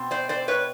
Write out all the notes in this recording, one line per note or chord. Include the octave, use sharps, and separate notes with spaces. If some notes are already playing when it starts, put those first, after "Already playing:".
Already playing: B2 C4
C5 D5
C5 D5
B4 C#5